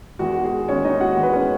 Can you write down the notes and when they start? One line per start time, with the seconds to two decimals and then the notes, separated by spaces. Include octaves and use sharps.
0.19 E2 D#3 G#3 F#4
0.44 G#4
0.68 E2 D#3 G#3 C#4 C#5
0.85 D#4 D#5
1.01 F#4 F#5
1.17 E2 D#3 G#3
1.23 B4
1.33 C#4 C#5